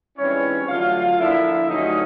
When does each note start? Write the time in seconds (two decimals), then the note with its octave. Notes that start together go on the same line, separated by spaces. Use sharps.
0.18 G#2 E3 G3 C4 C#4 E4 C#5
0.68 G2 D3 F#3 A3 F4 F5
1.18 D3 F3 A#3 D4 E4 E5
1.68 G2 D3 F#3 A3 C#4 D#4 D#5